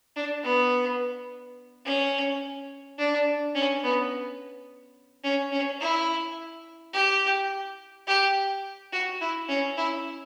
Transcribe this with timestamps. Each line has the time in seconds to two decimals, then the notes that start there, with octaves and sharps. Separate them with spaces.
0.16 D4
0.43 B3
1.86 C#4
2.99 D4
3.55 C#4
3.84 B3
5.24 C#4
5.52 C#4
5.81 E4
6.94 G4
8.07 G4
8.93 F#4
9.21 E4
9.49 C#4
9.77 E4